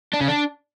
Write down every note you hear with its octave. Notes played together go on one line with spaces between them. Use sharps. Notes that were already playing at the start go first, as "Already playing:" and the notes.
D4
C#3
D4